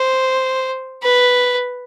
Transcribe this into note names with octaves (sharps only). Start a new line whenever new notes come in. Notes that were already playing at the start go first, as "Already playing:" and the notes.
Already playing: C5
B4